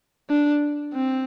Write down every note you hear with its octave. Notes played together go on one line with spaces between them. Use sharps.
D4
C4